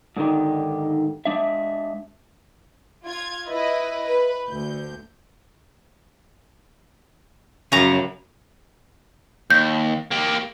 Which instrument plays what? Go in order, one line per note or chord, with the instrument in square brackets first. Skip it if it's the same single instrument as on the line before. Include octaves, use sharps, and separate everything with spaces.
[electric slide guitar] G#2 D3 D#3 G4
G#3 D4 E5
[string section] F4 G#6
E4 B4 D#5
B4
D2 G6
[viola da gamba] F#2 [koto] C#3 A#5
[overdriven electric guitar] D#2 [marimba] G6
[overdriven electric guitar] A#3 G4